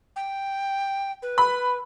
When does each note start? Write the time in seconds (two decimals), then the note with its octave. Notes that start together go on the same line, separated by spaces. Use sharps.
0.16 G5
1.22 B4
1.38 B5